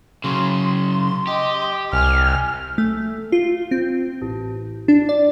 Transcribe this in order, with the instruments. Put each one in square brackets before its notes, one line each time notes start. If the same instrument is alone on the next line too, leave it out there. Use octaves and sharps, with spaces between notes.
[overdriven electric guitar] C#3 F#3 [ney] C6
[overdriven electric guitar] G4 [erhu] D#5
[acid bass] C2 [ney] G#5 [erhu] F6
[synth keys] A3
F4
C4
A1
D4
D5